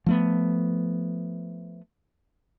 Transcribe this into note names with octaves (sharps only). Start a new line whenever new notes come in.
F3 A3 B3